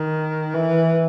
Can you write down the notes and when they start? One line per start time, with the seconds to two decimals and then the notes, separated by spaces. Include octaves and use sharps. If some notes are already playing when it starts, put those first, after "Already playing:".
Already playing: D#3
0.54 E3